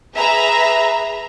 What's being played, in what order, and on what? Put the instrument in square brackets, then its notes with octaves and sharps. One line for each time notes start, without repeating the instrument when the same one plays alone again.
[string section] G#4 B4 E5 A#5